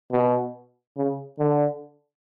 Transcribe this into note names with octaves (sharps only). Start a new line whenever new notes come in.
B2
C#3
D3